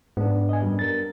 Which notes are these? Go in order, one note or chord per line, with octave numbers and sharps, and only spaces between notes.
G#2 B3 D4
D#5 G#5
F#2 G3
A#4 A6